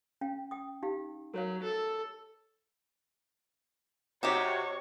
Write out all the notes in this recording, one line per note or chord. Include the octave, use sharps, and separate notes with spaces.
C#4 F5 G5
G5 D#6
D#4 G4 F5
F#3 A#4 C#5 F5
A4
C3 C4 D#4 F#4 G4 C#5